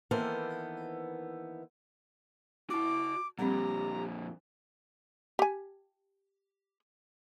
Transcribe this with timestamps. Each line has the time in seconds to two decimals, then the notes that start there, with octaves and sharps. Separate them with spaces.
0.11 D#3 E3 A#3 B3 A4 C5
2.70 E4 F#4 A5 D6
3.39 F2 A#2 G3 C4 G4 A#5
5.39 G4 G#5